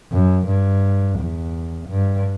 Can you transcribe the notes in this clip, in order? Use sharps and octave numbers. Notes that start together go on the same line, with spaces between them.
F#2
G2
E2
G2